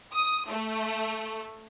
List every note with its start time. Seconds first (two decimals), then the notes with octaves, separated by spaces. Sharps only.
0.13 D#6
0.50 A3